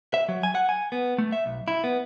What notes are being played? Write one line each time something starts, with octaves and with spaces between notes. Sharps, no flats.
E5
F#3
G#5
F#5
G#5
B3
A3
E5
B1
E4
B3